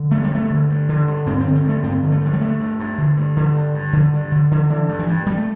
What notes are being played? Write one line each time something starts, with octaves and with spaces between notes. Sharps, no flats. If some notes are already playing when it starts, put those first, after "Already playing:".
Already playing: D3
G2 A3
G3
G2 A3
D3
G2
D3
G2
G2 C4
C4
D3
C4
G2 A3
G2 C4
D3
A3
G2 E3
G3
G2 A3
G2
G2
D3
G2
D3
G2
G2
D3
G2
D3
D3
D3 E3
G2
E3
G2
G2 G3
A3